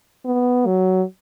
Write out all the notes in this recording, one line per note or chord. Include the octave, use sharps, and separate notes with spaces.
B3
F#3